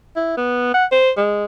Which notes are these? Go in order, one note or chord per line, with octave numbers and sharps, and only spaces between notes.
E4
B3
F#5
C5
G#3